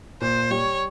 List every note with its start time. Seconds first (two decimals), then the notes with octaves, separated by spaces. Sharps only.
0.21 A#2 C5
0.51 G3 C#5